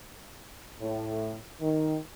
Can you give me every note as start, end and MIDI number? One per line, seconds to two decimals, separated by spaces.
0.79 1.34 45
1.60 1.97 51